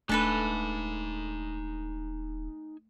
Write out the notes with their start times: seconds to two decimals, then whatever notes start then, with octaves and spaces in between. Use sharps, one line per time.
0.09 D#1 A3 D4 D#4 A4 B4 G#5